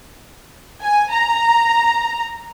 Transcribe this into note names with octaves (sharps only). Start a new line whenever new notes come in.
G#5
A#5